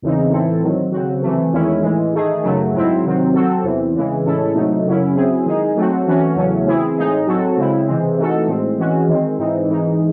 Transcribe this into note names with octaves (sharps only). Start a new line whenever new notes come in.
E2 C#3 E3 C4 D#4
A2 E3 C4 E4 A4
D#3 F#3 C4
C#3 F#3 C4 F#4
C3 E3 A3
E2 D#3 G#3 C#4 E4
A2 E3 G#3
D#3 A3 D#4 G#4
F#2 C#3 F#3 A3
G#2 F#3 C4 E4
C3 D#3 F#3 C4
F#3 C4 F#4 A4
E2 C3 E3 C4
C#3 E3 G#3
A2 G#3 C#4 E4 A4
C3 F#3 A3 D#4
F#2 C#3 F#3 C#4 E4
F#3 C4 E4 G#4
D#3 G#3 D#4 G#4
F#3 A3 C4 F#4
E3 A3 C#4 F#4
E2 C#3 F#3 A3 C#4
E3 C4 E4 G#4
A2 G#3 D#4 G#4
F#3 C4 F#4 A4
C#3 G#3 C4 E4
C3 E3 G#3 C4
E3 A3 D#4 F#4 A4
A2 G#3 C4
E3 G#3 C#4 F#4
D#3 G#3 C4
G#2 E3 C4 D#4
G#2 E3 G#3 D#4